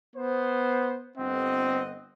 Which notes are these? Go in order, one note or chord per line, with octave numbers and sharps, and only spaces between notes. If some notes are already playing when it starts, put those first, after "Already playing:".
B3 C5
G1 C4 D#5 F#5